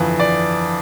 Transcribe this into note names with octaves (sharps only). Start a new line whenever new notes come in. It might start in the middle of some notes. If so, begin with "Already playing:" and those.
Already playing: G1 F2 E3
D5